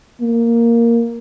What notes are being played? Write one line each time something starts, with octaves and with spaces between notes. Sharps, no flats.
A#3